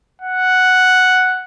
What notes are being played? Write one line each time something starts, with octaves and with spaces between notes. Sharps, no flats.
F#5